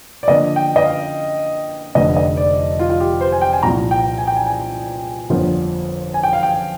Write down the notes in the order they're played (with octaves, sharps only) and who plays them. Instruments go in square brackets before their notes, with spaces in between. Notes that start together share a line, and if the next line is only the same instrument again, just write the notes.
[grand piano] D5
[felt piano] D3 F3 A#3 D4 [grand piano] D#5
[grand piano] G5
D#5
F5
[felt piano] F1 F2 D3 [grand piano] D#5
[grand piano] D#5
D5
F4
F4
G4
C5
G#5
G5
G#5
[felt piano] C2 A#2 F3 [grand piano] A#5
[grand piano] G5
G#5
G5
G#5
G#5
[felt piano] G1 F2 D3 F3 A#3
[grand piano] G#5
G5
F5
G5